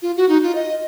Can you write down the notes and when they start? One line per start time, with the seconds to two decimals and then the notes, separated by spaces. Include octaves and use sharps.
0.02 F4
0.16 F#4
0.29 D#4
0.43 F4
0.55 D#5